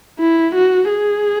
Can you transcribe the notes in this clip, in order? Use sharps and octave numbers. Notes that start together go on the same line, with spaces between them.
E4
F#4
G#4